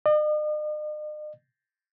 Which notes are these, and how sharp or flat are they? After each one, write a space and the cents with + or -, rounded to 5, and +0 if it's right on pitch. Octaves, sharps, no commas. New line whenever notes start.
D#5 -45